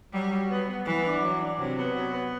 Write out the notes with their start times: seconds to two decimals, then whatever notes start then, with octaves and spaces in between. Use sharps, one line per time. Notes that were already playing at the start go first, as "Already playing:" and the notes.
0.13 F#3 G3
0.31 F#3
0.49 B3
0.68 B3
0.85 E3 B3
1.04 D4
1.22 F#3
1.40 D4
1.58 C3 F#3
1.77 B3
1.95 F#3
2.13 B3